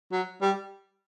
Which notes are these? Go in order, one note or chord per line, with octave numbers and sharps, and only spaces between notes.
F#3
G3